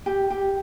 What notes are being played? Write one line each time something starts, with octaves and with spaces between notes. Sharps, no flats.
G4
G4